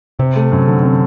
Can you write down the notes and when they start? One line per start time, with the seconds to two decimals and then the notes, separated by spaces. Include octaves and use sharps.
0.19 C3 C4
0.36 A3
0.52 F#2
0.67 D3
0.83 C4